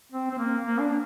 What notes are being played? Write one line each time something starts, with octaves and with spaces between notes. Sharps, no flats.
C4
C4
A#3
A#3
D4